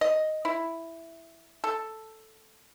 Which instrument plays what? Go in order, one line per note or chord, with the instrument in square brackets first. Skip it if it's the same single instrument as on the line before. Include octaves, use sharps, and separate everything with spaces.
[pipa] D#5
E4
A4